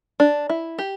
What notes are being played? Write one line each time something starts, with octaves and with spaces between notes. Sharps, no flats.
D4
E4
G4